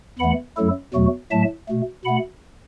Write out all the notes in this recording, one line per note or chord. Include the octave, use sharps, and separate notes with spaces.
E2 E3 A3 F#5 B5
F#2 F#3 A3 E4 A4
E2 B2 F#3 A3 F#4
A2 F#3 A3 E5 A5
B2 A3
B2 A3 F#5 B5